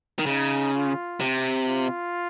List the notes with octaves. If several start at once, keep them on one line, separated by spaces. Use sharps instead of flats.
D#3
C#3 D#4
F4
C3
F4